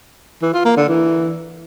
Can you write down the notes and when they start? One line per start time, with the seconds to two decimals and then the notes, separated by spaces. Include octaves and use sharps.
0.42 E3
0.54 F4
0.65 A#3
0.77 D3
0.88 E3